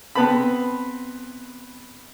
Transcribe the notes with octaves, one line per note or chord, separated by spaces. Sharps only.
B3 C4 B4 A5 B5